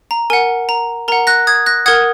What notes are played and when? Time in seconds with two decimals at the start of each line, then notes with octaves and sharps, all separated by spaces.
0.11 A#5
0.30 A#4 F#5 G#5
0.69 A#5
1.08 A#4 F#5 A#5
1.27 F#6 A#6
1.47 D#6 G#6
1.66 F#6 A#6
1.86 A#4 F#5 D#6 G#6